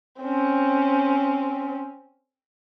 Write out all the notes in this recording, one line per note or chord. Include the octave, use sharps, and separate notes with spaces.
C4 C#4